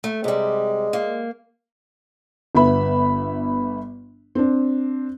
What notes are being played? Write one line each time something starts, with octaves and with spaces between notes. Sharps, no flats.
A3
C3 G3 G#3
A#3
G1 B3 E5 B5
C4 D4